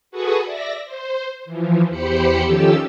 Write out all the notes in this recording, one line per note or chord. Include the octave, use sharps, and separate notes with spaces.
F#4 G#4 A4 B4 C#6 D#6
D5 E5 A#6
C5
E3 F3
E2 G4 C5 B5 C#7
D#3 F3 C#4 G4 A4 E6